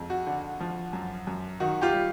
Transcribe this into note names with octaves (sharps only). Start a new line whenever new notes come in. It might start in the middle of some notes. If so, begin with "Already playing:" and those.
Already playing: F2 G#3
F#4
D3
F3
F#2
F#2
D#3 F#4
F4 G4
G3